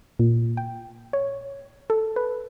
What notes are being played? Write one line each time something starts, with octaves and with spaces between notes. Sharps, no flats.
A#2
G5
C#5
A4
B4